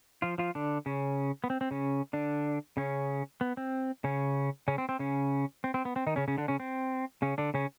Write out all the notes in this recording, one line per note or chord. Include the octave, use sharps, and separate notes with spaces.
F3 F4
F3 F4
D3 D4
C#3 C#4
B3
C4
C4
C#3 C#4
D3 D4
C#3 C#4
B3
C4
C#3 C#4
C#3 C#4
C4
C4
C#3 C#4
C4
C4
B3
C4
D#3 D#4
C#3 C#4
C#3 C#4
D3 D4
C#3 C#4
C4
C#3 C#4
D3 D4
C#3 C#4